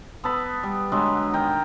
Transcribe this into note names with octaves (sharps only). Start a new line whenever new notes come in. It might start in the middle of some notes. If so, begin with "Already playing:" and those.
B3 A4 A5 B5
G3
D3 F#3 G#3 B3
D#3 G5 A#5